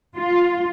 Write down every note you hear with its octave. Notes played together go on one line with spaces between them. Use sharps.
F4